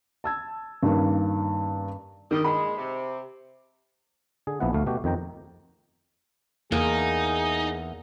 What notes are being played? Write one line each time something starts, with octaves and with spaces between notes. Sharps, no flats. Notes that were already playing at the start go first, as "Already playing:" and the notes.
A5 E6 G#6
G2 D#3 A#3 C#4
D#3 G3 D#5
A#2 G#3 B5
C3
D3 G#4
A#1 F3 B3 E4 F#5
D2 A3 F5
B2 A3 F#4 G4
F2 D#3 G5 A#5
E2 A#3 D#4 G#4